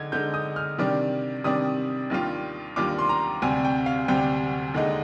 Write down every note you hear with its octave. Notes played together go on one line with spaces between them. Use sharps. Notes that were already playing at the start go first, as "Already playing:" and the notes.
Already playing: D3 G#3 D#4 G#6
D3 G#3 D#4 G6
D#6
F6
C3 D#3 G3 D4
C3 D#3 G3 D4 D#6
D#2 D#3 G3 D4 F4
D#2 D#3 G3 D4 F4 D6
C6
A#5
D2 C3 G3 C4 G#5
G5
F5
D2 C3 G3 C4 G5
D#2 D3 G#3 D#4